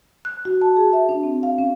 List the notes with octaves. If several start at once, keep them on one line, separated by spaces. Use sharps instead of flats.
F#6
F#4
A5
G#4
E5
D4
C4
F5
C#4